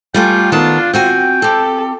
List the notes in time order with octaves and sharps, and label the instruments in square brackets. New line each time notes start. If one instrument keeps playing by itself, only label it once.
[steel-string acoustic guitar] G3 A3 G#4 [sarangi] F4 [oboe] G5
[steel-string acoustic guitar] D#3 B3 A5 [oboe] D4
[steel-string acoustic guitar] C4 F#4 G#5 [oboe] G5
[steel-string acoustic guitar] C4 G4 [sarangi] A4